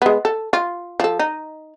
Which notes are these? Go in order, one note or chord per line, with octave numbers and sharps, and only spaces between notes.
G#3 B3
A4
F4
F3 A4
D#4